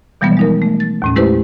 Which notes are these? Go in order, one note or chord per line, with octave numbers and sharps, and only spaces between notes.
B2 E3 F3 G3 G#3 B3
G#3 D#4 A#4
A3
A6
D#2 A2 C#4
G#3 A3 E4 G4 B4 C5